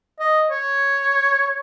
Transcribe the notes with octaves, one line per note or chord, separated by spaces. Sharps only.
D#5
C#5